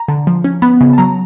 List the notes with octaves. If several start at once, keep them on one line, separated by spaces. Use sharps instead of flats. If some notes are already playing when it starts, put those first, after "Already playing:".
Already playing: A#5
D3
F3
C#4
B3 B5
C#3
A5
F#3 A#5